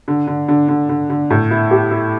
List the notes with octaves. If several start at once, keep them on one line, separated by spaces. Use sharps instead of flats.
D3
D3
D3
D3
D3
D3
A2
E4
G4
E4